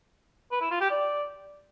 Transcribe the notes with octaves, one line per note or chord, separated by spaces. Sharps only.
B4
E4
F4
G4
D5